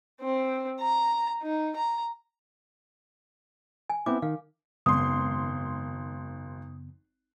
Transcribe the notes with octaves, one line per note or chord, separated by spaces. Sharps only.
C4
A#5
D#4
A#5
G#5
B3 C4 E4 D6
D#3 F5
G#1 F#2 C#3 B3 C6 D#6